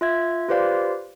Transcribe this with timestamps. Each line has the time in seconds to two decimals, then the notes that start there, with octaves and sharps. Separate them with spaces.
0.01 F4 E5 G#6
0.49 F4 G4 B4 C5 D5 F5